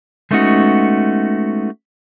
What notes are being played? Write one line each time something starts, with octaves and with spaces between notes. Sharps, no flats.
G#3 A3 B3 C#4 D#4 F#4